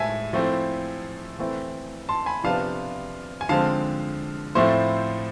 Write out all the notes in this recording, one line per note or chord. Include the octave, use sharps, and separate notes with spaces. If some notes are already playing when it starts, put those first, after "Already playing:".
Already playing: A2 G#3 E5 G#5 A5
F3 A3 C4 E4
E3 A3 C4 E4
A5 C6
G#5 B5
C3 F3 B3 D4 F4 F5 A5
G#5
D3 F3 G#3 C4 F5 A5
A2 F3 A3 C4 E4 C5